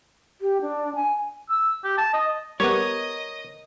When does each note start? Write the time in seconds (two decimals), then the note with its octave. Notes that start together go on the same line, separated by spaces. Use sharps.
0.41 G4
0.61 D4
0.95 G#5
1.50 E6
1.84 G4
1.98 A5
2.13 D#5
2.60 G3 B3 A#4 C#5 D#5 D#6